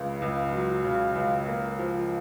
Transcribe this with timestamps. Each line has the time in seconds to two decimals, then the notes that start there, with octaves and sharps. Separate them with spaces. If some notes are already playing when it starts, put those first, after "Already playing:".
Already playing: C#2 C#3
0.22 C#2
0.53 F#3
0.84 C#3
1.15 C#2
1.48 A#3
1.79 F3